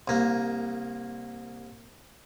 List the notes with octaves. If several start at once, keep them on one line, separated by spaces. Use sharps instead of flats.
C2 A#3